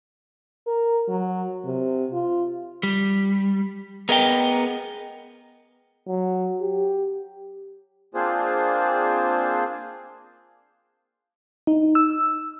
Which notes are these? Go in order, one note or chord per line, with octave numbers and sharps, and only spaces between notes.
A#4
F#3
C3
F4
G3
B3 G#4 A#4 D#5 G5
F#3
G4
A#3 C4 D4 F4 G#4 C5
D#4
E6